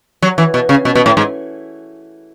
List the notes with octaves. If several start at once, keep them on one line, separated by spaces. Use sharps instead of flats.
F#3
E3
B2
C#3
B2
B2
A2
G#2